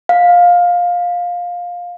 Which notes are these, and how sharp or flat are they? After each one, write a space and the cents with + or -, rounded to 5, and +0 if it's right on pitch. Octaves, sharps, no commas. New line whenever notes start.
F5 +15